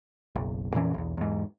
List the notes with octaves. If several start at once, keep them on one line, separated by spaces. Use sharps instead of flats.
F#1 B1
F2 A#2 E3 C#4
B1 E2
E2 G#2